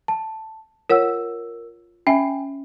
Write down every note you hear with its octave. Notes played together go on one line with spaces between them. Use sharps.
A5
F4 A#4 C#5 F#5 E6
C#4 E5 G5 G#5